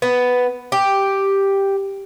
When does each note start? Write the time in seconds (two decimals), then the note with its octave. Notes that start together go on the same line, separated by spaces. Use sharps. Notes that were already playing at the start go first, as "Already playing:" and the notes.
0.02 B3
0.72 G4